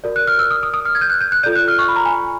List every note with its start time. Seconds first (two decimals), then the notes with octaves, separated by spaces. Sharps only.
0.04 F#4 A#4 D5
0.16 F#6
0.27 F6
0.39 E6
0.51 D#6
0.63 D#6
0.74 D#6
0.85 F6
0.95 G#6
1.01 G6
1.10 F#6
1.21 G6
1.32 F#6
1.43 F4 A4 D5 G6
1.56 F#6
1.68 F6
1.79 C#6
1.88 B5
1.96 A#5
2.05 G#5